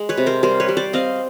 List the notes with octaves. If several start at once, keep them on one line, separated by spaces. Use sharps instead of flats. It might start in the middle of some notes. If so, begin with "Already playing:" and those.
Already playing: G#3
B4 C#5
C3
A#4 C5
G3 A#4 C5
B4 C#5
G3
C5 D5
C4 D#5 F5